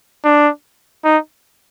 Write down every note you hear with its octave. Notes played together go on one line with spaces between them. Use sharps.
D4
D#4